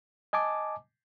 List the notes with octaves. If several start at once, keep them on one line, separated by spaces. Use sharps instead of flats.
D#5 G#5 A5 D6